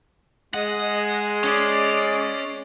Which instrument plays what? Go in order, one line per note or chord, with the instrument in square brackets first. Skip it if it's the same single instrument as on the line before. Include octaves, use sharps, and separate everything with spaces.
[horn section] G#3 [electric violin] D#5 [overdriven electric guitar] F#5
[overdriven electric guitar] C#4 [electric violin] D5 C7